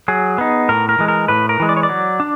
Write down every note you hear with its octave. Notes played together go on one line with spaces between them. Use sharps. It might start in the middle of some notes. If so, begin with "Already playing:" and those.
F#3 G#4
B3 D#4
A2 A#4
A#4
E3 G#3
A#4
A2 B4
A#4
E3 G#3
D5
C#5
D5
F#3
D4